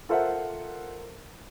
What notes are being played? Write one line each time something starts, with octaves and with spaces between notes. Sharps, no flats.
F4 A4 A#4 C5 E5 F#5